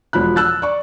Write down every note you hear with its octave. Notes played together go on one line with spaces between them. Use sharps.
E1 F3 B5 F#6
E6 F#6 A6
D5 C#6